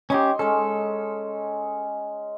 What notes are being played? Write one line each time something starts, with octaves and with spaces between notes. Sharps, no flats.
C#4 D#4 G4 C6
G#3 C#4 A4